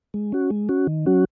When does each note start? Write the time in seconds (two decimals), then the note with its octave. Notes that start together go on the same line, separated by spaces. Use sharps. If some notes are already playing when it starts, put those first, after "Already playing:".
0.14 G#3
0.32 C#4 F#4
0.50 G#3
0.69 C#4 F#4
0.87 D#3
1.06 F#3 C#4 F#4